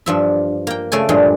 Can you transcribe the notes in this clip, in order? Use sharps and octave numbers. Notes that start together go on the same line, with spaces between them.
G2 F3 E5
A#3 G5
C#3 A3 D5 G#5
G2 A#2 F3 G#3